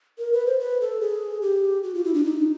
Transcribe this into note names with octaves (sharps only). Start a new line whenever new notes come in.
A#4
B4
C5
B4
A4
G#4
G4
F#4
F4
E4
D4
D#4